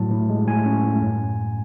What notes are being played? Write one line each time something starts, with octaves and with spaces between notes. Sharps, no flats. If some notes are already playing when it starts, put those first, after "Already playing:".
Already playing: A2 F#3 A5
A2
G#3
A2 G#5
C#4
A2
F#2